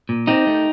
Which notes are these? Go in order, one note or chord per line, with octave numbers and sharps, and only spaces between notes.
A#2
C4 D#4 G4
A3